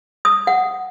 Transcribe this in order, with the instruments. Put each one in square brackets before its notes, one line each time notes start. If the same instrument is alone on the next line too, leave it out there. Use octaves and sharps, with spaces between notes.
[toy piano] D#6
F#5